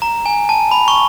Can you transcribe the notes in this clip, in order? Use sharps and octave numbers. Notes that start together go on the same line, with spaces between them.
A#5
G#5
A5
B5
C#6